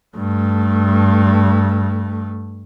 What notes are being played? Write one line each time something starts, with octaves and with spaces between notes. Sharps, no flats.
G2 A3